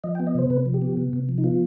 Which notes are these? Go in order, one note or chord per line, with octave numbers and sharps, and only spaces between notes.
F3 D#5
G5
B3
D#5
C3 C5
C3 B4
F3
G4
B3
C3
C3
F3
D#4
B3 F4